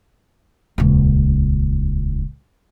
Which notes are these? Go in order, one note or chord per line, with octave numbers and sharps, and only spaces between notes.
D#1 C#2